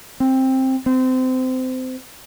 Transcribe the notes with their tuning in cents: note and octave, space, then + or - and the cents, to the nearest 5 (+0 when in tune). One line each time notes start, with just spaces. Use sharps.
C4 +10
C4 -25